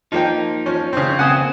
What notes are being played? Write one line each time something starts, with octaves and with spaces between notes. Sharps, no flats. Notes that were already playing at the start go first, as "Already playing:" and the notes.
F3 A#3 D#4 G5
F3 C#4
C#3 C4
C#3 A#3 C4 F#5 G#5 D#6